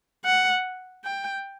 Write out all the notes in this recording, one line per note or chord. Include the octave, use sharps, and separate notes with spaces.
F#5
G5